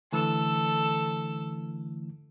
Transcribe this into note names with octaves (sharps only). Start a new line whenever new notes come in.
D3 E3 A3 A4 E6